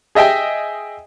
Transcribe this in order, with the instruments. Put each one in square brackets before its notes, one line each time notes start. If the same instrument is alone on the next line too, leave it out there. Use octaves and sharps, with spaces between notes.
[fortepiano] G#4 D#5 E5 G5 G#5